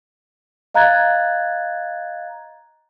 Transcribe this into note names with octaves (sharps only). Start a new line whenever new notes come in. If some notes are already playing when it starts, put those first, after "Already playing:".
D#5 F5 A#5 F#6 G#6 A6